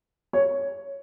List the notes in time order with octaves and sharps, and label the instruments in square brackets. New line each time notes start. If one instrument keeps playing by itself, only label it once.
[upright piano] C#5